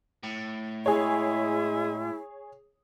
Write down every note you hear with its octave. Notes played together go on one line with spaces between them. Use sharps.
A2
G#3 E4 G#4 C#5